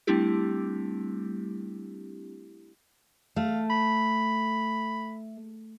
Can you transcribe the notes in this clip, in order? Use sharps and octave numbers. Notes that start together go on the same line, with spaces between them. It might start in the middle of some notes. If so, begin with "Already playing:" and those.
G3 A3 C4 D4 E4 G4
A3 F5
B5